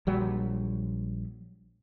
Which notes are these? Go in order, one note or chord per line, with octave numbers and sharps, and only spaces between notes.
A#1 F#3 G3